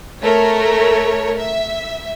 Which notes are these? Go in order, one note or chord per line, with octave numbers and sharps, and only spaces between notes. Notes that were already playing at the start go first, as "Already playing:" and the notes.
A3 A#4 C#5
E5